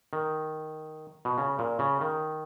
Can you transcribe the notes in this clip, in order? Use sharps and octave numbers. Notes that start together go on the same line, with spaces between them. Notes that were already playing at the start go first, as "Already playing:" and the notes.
D#3
B2
C#3
A#2
C#3
D#3